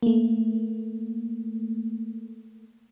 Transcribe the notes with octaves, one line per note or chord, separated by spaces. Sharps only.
A3 A#3